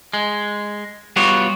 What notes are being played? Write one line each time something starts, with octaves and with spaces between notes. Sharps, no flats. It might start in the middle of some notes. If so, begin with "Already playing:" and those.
G#3
G3 B3 F4 F#4 C#5